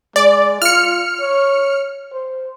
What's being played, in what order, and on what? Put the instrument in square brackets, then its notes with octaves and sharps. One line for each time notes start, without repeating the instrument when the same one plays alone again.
[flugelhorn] G#3 [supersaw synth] D5
[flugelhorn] F4 [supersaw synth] F6 C#7
[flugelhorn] C#5
C5